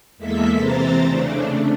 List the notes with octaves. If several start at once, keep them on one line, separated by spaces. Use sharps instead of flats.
E2 G#3 A#3 A4 E5 B6
C3 E3 C4 C5 A#5 A6
C#3 A3 D4